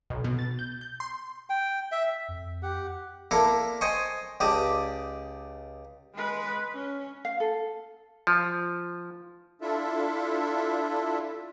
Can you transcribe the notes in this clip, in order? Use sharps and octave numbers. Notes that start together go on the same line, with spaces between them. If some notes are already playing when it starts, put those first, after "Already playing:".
B1
B2
A6
G6
G6
C6
G5
E5
F2
G4 F#5
A#3 D4 E4 A4 A#4
C5 D#5 G5 G#5 C#6
C#2 G4 D5 D#5 A5
G#3 B4
C#4
F5
A4
F3
D4 E4 F4 A4 E5